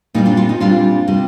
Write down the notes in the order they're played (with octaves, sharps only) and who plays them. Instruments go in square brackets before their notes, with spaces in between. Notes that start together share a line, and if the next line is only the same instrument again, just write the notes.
[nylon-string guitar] A#2 G3 C4 D#4
D4 F4
D4 F4
D#4
A#2 G3 C4 D4 F4
C3 G3 C4